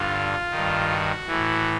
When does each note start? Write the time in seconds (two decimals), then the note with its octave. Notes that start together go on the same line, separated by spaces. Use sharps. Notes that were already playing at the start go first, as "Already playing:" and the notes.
Already playing: G2 D3 F4
0.50 G2 D#3
0.89 F#4
1.27 A2 E3